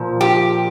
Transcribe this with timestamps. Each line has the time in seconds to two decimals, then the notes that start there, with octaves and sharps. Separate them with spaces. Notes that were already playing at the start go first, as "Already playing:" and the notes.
Already playing: A#2 F3
0.21 G4